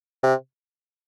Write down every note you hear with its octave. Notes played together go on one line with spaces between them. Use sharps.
C3